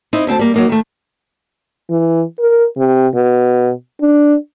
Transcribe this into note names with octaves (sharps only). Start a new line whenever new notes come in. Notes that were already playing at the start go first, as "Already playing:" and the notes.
C4 D#4 E4
D2 C4 G5 A5
G3 A#3
F#3 A#3 D#4
D#3 A3
E3
A#4
C3
B2
D4